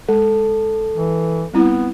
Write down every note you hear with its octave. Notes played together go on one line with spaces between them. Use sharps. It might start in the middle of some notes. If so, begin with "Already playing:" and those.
G#3 A4
E3
G3 B3 C4 E4